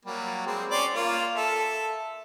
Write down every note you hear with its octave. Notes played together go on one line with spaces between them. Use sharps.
F#3 G3 A#3
G3 G#3 C4
C#4 D5 C6
A#3 F4
A4 E5